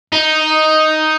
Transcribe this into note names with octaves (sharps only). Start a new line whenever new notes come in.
D#4